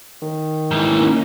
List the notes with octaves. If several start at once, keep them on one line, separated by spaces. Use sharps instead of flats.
D#3
G#2 E3 A#3 C#4 D#4